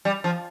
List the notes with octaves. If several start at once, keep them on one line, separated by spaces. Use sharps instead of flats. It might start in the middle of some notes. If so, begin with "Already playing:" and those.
G3
F3